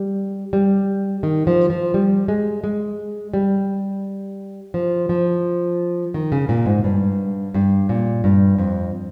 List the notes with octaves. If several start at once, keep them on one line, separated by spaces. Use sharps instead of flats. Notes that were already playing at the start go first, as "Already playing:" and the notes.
Already playing: G3
G3
D#3
F3
F3
G3
G#3
G#3
G3
F3
F3
D#3
C#3
A#2
G#2
G2
G2
A#2
G2
F2